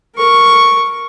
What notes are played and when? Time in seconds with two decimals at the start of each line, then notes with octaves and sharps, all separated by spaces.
0.17 A#4 C#6